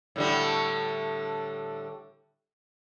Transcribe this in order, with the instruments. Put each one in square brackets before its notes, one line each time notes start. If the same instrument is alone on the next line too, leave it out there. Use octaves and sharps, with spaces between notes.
[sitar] A2 D3 G3